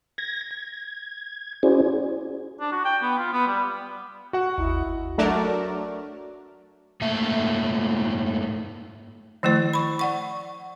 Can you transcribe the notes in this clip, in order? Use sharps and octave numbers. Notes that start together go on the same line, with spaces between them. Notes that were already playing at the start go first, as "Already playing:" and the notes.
G#6 A#6
G#6
C#4 E4 F#4 G#4 C5 D5
D4
F#4
G5
B3
F4
B3
G3
F#4 F#5
G#1 D#2 E4
F#3 A3 D4 F#4 A#4 D5
G#2 A3 A#3 E5 A5
D#3 F3 A3 E4 C5
B5 C#6
D5 F#5 C#6